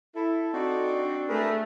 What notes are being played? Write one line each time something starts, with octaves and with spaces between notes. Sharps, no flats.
E4 A4
C4 D#4 F#4 D5
D4
A3 G#4 A#4 B4